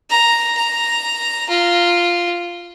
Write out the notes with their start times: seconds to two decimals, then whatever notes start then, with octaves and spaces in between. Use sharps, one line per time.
0.10 A#5
0.57 A#5
1.49 F4